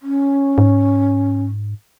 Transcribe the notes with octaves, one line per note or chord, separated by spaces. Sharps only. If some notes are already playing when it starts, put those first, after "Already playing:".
C#4
G#2